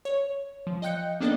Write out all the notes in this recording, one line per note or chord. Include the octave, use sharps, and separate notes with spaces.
C#5
F3
D#5 F5 G5 F#6 G6 C#7
A#3 B3 D4 A4 D5 D#5